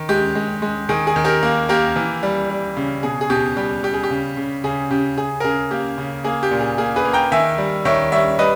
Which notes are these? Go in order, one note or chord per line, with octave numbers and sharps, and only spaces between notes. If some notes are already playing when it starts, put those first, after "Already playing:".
Already playing: D#3
G#3 G4
G#3
G#3
D#3 G#4
G#4
D#3
G4 A#4
A#3
A#3 G4 A#4
E3
G3
G3
C#3
B2 G#4
G#4
B2 G4
G3 G4
G3 G4
G#4
G4
C#3
C#3
C#3 G#4
C#3 G4
C#3 G#4
A#4
C#3 G#4
A#3 G4
C#3
A#3 G#4
G4
A#2
G#4
A#3 G#4
G#4 B4
A#3
G5 A#5
D#3 E5 G#5
G3
D#3 C#5 E5
G3 C#5 E5
G3 B4 D#5